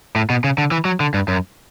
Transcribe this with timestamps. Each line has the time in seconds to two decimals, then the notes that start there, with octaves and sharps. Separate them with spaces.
0.16 A2
0.30 B2
0.44 C#3
0.58 D3
0.71 E3
0.85 F#3
1.00 D3
1.14 G2
1.28 F#2